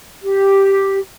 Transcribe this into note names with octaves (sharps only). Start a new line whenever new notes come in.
G4